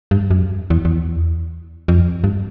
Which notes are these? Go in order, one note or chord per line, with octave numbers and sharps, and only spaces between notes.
G2
F#2
E2
E2
F2
G2